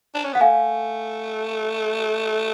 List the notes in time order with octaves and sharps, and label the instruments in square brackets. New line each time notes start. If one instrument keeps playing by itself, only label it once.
[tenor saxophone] D4
C#4
[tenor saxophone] B3 [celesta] F#5
[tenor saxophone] A3 [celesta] F5 G#5